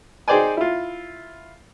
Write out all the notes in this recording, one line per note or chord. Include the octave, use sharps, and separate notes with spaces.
D#4 G#4 C5 D5 G5 G#5
E4 F4